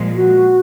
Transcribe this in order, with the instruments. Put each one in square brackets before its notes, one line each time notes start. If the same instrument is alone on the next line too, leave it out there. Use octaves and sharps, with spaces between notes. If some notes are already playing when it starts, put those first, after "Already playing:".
Already playing: [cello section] A#2 F3 G#3
[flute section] F#4